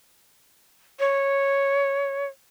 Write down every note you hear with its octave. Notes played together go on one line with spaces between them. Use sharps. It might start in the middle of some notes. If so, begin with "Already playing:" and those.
C#5